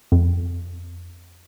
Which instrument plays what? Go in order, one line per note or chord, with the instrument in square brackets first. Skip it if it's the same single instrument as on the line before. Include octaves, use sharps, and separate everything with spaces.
[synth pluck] F2